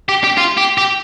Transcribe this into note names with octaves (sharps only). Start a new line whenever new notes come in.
G4
G4
F4
G4
G4